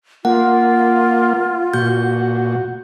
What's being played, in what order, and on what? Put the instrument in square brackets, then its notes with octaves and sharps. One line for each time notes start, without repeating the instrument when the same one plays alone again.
[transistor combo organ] A#3 [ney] F4 [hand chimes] F#5
[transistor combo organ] A#2 F#4 [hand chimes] G6